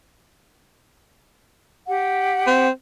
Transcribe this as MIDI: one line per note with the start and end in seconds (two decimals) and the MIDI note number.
1.87 2.66 67
1.87 2.66 78
2.47 2.70 60